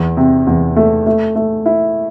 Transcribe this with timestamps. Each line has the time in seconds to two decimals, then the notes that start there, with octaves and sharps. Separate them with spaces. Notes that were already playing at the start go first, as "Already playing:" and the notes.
Already playing: E2
0.17 C3
0.47 E2
0.76 A3
1.06 A3
1.36 A3
1.66 E4